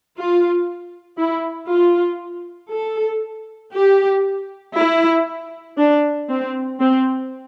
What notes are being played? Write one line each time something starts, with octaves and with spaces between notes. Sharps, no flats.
F4
E4
F4
A4
G4
E4
D4
C4
C4